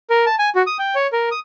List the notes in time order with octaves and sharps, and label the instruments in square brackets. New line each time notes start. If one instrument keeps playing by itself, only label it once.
[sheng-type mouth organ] A#4
A5
G#5
F#4
D#6
G5
C#5
A#4
D#6